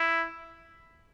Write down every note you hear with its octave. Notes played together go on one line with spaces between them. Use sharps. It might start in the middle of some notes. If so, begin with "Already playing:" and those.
Already playing: E4